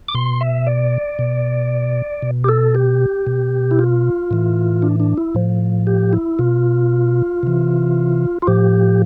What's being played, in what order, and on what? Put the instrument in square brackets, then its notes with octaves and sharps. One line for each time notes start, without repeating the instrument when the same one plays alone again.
[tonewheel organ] D6
B2 C6
E5
D5
B2
B2
G4
A4
G4
B2
E4
F4
A2 E3
D4
D4
E4
A2 F3
G4
E4
B2 F4
C3 E3
F4
A2 F3 G4